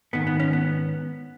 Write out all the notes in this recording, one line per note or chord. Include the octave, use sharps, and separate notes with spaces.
G#2 D#3 B3
B3
C#4
B3